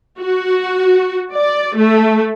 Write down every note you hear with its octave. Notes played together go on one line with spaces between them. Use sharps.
F#4
D5
A3